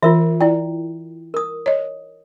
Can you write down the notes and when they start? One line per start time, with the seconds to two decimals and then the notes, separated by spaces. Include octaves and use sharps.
0.03 E3 F4 A#4 E5
0.41 E4 D5 G5
1.34 A#4 D#6
1.66 C#5 D#5